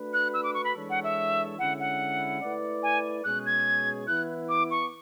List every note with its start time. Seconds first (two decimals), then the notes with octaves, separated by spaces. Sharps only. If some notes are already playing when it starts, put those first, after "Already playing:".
Already playing: A3 D4 F#4 B4
0.13 F#6
0.34 E6
0.44 D6
0.54 C#6
0.64 B5
0.75 E3 G#3 D4 A4 C#5
0.90 F#5
1.04 E5
1.59 D3 G#3 C#4 E4 F#5
1.80 F#5
2.41 A3 E4 B4 D5
2.83 G#5
3.24 B2 G#3 C#4 G#4 C#5 F#6
3.46 G#6
4.07 E3 B3 E4 F#6
4.49 D6
4.71 C#6